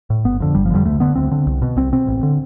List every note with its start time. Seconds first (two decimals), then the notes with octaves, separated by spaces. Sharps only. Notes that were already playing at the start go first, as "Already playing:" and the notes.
0.10 A2
0.25 G1 B3
0.40 F2 D3
0.55 G1 G3
0.66 F3
0.70 F2 D3 G3
0.85 D2 A3
1.00 D3 B3
1.15 D2 C4
1.31 D3
1.47 C2
1.62 B2
1.76 C2 C4
1.92 B2 C4
2.07 A1
2.23 D3